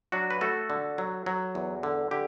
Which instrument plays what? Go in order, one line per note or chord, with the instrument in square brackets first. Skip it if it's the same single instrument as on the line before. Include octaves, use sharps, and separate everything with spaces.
[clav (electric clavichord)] F#3 D4 F#4
B4
A3 F#4 A4
D3
F#3
F#3
E2
D3
D3 G4